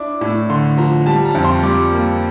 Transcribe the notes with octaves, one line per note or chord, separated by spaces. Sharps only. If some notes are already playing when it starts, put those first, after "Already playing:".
Already playing: D4 E4 D6
A2
D3 C6
F3 A#5
G3 A5
A#5
F2
C6
G3 D6
A#3